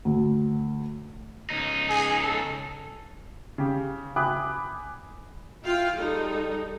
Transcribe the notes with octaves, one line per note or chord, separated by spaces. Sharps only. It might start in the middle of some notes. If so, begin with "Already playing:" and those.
D2
C#2 D#4
G#4
A4
C#3 G4
G5 G#5 B5 D6 D#6 F#6
E4 F4 F5 G5
G3 G#3 D#4 A4